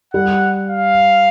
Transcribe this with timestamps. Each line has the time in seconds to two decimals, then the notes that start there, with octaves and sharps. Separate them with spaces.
0.14 G3 F#5
0.69 F5